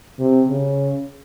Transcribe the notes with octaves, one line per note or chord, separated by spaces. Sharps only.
C3
C#3